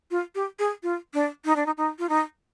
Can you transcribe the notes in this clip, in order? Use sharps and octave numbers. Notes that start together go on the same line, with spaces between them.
F4
G4
G#4
F4
D4
D#4
D4
D#4
D#4
F4
D#4